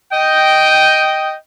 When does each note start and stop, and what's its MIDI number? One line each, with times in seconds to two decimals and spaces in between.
0.12 1.35 75
0.12 1.35 79